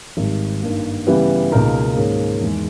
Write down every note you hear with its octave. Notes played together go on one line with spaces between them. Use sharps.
G#1 G#2 G3
G2 D#3 A#3 D#4
C#3 E3 G3 B3
C#2 B2 A#3 D#4 A#4
G#2 D#3 A#3 C#4 G#4
E2 D#3 G#3